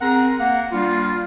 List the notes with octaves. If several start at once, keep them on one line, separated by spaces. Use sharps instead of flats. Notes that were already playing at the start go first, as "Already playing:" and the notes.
C4 G#4 A#4 F#5 A#5
A#3 F#5
G3 A#3 D4 F4